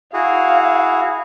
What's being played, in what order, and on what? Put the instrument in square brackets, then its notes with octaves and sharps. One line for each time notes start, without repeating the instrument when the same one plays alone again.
[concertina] E4 F#4 G#4 [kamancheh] F5